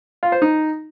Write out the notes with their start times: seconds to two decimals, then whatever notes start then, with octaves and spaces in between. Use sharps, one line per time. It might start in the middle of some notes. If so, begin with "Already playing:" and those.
0.23 F4
0.32 C5
0.42 D#4